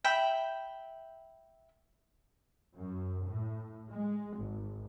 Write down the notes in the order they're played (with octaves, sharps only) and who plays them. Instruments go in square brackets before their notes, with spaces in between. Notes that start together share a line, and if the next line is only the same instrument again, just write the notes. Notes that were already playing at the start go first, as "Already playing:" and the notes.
[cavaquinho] E5 G5 B5
[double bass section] F#2
A2
G#3
G#1